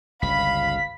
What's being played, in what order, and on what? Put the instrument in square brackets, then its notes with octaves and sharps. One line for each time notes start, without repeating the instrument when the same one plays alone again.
[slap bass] G1 C#2 [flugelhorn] F5 [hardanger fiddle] B5 [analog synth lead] B6